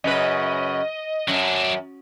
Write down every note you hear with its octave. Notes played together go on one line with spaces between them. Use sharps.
F#2 C#3 B4 D#5
F#2 F#3 D4